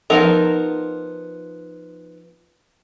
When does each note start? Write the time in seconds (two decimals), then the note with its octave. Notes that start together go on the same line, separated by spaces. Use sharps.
0.10 F3 B3 D#4 A#4 A#5